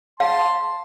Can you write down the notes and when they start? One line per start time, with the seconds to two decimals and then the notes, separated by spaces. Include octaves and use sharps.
0.20 F5 A5 C6